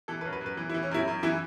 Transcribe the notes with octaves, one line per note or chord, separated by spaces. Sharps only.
E3 A4
B4
F#2
B4
F#2
B4
E3
E4
E3
C#4
F#2 E4
F#2
E3 E4